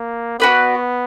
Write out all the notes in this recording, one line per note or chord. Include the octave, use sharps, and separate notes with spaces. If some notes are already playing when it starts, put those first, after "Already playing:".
Already playing: A#3
B3 F#4 B4 D5